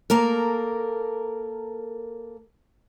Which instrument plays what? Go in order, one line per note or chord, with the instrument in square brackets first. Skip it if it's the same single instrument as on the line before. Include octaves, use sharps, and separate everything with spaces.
[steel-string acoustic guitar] A#3 A4 A#4